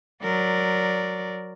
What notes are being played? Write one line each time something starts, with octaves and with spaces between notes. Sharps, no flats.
F#3 A#4 D5